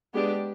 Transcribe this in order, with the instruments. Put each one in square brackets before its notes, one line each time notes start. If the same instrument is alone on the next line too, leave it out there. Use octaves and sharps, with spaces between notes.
[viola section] G#3 B3 D4 G4